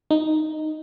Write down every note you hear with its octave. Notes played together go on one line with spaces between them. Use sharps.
D#4